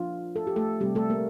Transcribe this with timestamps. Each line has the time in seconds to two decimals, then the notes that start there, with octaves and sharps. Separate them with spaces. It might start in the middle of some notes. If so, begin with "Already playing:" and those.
Already playing: F3 A#3 D4 F4
0.36 A4
0.47 G4
0.56 A3 A4
0.80 C3 G3 C4 G4
0.95 A3 A4
1.10 A#3 A#4